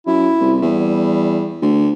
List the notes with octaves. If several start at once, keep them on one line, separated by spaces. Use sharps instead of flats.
F#2 E4
C2
E2 G3
D2